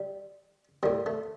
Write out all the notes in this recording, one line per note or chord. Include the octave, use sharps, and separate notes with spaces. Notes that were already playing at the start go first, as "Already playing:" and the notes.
Already playing: G3
A2 G3 A#3
A3